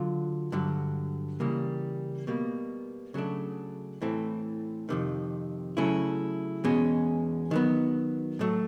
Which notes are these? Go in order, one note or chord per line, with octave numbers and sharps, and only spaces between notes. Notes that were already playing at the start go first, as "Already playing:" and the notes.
Already playing: D3 F#3 F4
G2 D3 F#3
C#3 E3 G3 A#3
B2 G3 A#3
C#3 F#3 A3 D4
A2 E3 A3 C4
F2 C3 D#3
C#3 F#3 A3 C#4 E4
E2 B2 G#3 C#4
D#3 F#3 B3
A2 F#3 A3